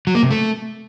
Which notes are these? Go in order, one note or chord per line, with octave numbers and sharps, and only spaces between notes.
F#3
A#3
C3
A3